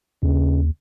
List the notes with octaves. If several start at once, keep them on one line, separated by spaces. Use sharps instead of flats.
D#2 C#3